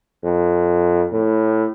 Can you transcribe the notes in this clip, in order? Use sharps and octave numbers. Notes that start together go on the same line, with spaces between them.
F2
A2